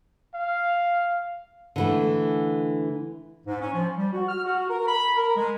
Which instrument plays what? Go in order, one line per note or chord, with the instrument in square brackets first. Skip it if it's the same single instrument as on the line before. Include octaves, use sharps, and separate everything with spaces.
[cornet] F5
[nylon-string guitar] D3 E3 A3
[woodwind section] G#2
C#4
F3
G3
F#4
F6
F#4
A#4
B5
A#4
G#3